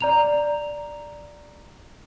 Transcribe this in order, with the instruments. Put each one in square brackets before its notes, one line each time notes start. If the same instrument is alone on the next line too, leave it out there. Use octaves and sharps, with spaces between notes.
[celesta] D5 A#5 F7